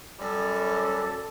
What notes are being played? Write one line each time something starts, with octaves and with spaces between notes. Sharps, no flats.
F#2 G3 A4